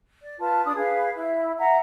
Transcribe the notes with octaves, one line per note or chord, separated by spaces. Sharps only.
D5
F4 B4 A5
D4 D#6
G#4 B4 F5
E4
E5 F#5 A#5